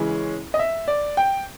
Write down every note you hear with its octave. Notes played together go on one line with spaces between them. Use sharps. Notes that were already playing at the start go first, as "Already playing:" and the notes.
Already playing: C#3 E3 G#3 C#4
D#5
E5
D5
G5